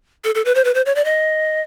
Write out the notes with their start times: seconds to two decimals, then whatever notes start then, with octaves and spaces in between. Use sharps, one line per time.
0.24 A4
0.35 A4
0.45 B4
0.55 C5
0.64 B4
0.75 C5
0.86 C#5
0.95 D5
1.05 D#5